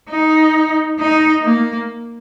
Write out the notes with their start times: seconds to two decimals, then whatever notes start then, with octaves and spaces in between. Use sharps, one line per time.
0.10 D#4
0.99 D#4
1.44 A#3